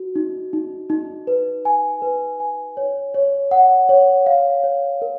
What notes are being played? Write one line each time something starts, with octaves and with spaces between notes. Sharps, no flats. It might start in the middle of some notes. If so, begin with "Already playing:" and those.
Already playing: F#4
D#4
D#4
D#4
B4
G#5
B4
G#5
C#5
C#5
F#5
C#5
F5
C#5
A#4